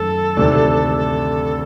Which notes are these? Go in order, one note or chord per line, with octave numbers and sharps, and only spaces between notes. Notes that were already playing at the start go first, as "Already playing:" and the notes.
Already playing: F#2 D#3 A3 A4
D2 C3 D#3 A3 D4
A4